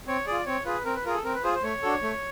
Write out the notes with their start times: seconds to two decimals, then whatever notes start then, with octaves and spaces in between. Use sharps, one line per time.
0.07 C4 C#5
0.26 F4 G#4 D5
0.46 C4 C#5
0.65 F4 G#4 B4
0.85 C4 A#4
0.95 B4
1.05 F4 G#4 A#4
1.15 A4
1.24 C4 A#4
1.34 B4
1.43 F4 G#4 C5
1.54 C5
1.63 A3 C#5
1.83 D4 F#4 A4
2.02 A3